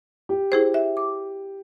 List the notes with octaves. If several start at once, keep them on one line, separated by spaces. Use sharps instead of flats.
G4
E4 G#4 C5
E5
D6